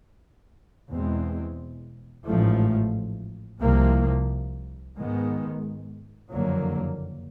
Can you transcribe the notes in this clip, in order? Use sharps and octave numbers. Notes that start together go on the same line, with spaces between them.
E2 B2 G#3 C4
A1 G#2 F3 A3
C2 C3 F3 A#3
G#2 D#3 G#3 B3
F#1 F2 D3 F#3 A#3